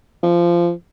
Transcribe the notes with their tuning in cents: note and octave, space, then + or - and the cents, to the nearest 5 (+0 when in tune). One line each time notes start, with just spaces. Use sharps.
F3 -20